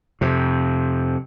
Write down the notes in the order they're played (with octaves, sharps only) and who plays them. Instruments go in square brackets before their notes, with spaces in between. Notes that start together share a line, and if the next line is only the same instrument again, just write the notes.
[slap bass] F2 C3